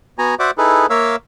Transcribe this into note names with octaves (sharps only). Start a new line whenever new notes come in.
B3 F#4 G#5 A#5
F#4 C5 D5 E5 F#5 D6
D#4 E4 G#4 A4 B4
A#3 A#4 C#5 E5 F5 E6